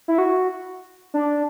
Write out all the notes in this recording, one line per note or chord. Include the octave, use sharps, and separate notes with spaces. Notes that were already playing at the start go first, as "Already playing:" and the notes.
E4
F#4
D4